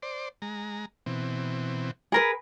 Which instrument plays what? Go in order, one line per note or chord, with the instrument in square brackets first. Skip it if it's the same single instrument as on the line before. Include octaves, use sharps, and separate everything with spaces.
[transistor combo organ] C5 D5
G#3 A#5
B2 E3 C4
[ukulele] G#4 A#4 B4